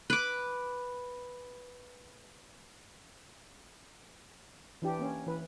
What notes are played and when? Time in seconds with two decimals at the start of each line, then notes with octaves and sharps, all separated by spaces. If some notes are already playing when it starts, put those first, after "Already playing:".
0.10 B4 D6
4.82 E3 D4 G4
4.99 A#3 C#4
5.27 E3 B4